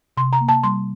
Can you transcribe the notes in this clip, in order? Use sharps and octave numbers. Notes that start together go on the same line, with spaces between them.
C3 C6
A#5
A#3
A5
G3 C6